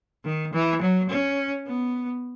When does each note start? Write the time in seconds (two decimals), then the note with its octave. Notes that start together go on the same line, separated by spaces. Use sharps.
0.24 D#3
0.53 E3
0.81 F#3
1.09 C#4
1.66 B3